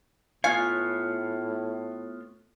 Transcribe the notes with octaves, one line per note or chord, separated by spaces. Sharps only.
A2 B3 F4 C#5 F5 G#5